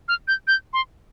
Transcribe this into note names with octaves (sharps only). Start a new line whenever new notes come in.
F6
G6
G6
C6